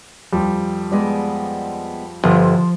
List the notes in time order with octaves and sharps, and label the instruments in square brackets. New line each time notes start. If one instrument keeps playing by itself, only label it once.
[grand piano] F2 G3 F4
[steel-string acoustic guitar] G#3 B3 D5
[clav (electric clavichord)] G1 [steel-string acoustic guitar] F3 C5